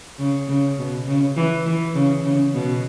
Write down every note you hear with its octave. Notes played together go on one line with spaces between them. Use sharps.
C#3
C#3
B2
C#3
E3
E3
C#3
C#3
B2